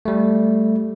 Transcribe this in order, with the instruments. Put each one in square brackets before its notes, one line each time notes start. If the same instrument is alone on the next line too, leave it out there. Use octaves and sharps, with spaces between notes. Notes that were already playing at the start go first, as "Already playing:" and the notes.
[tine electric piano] G3 A3